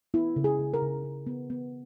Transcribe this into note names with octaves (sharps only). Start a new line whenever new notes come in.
B3 E4
C#3
G#4
C#3
A#4
C#3
C#3
B3
B3